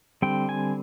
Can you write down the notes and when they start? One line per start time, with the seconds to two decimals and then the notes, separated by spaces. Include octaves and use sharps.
0.22 D3 G3 C4 G5
0.49 G#5